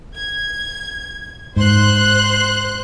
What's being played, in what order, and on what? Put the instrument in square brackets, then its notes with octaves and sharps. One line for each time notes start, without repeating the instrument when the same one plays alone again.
[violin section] G#6
[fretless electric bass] G#2 [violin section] C5 C6 F#6